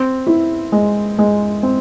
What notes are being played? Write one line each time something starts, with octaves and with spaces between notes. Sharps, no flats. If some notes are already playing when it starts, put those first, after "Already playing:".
Already playing: C4
E4
G#3
G#3
C4